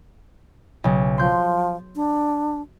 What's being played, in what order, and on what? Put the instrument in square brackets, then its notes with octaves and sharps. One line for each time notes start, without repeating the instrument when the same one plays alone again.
[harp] B1 C#3
[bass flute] F3 [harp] C6 G6
[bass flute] D4